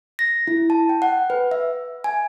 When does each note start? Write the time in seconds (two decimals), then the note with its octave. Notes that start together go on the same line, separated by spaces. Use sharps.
0.19 A#6
0.47 E4
0.70 A5
0.89 G5
1.02 F#5
1.30 B4
1.51 E5
2.04 G#5